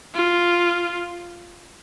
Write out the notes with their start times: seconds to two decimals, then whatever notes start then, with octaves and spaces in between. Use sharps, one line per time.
0.14 F4